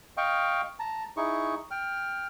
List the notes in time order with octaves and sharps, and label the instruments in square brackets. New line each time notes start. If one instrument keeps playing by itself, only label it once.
[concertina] D#5 F5 G5 C#6
A5 A#5
D#4 E4 G#4 C#6
G5 F6